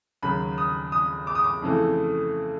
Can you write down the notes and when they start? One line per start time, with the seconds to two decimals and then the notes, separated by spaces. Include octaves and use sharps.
0.23 D#2 C#3 F#3 B5
0.58 D#6
0.92 D#6
1.27 D6
1.35 D#6
1.44 D6
1.62 F2 C#3 E3 A3